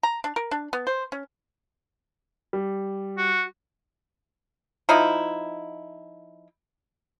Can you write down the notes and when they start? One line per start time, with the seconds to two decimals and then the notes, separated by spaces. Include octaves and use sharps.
0.03 A#5
0.24 D4
0.36 A#4
0.51 D4
0.73 B3
0.87 C5
1.12 C#4
2.53 G3
3.18 F#4
4.89 F3 D#4 E4